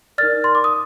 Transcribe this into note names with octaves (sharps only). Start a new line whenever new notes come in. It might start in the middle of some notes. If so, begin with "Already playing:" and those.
D#4 A#4 D5 F6 A6
C6
D6
D#6